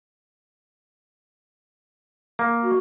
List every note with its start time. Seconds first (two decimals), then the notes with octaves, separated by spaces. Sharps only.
2.39 A#3
2.63 F#4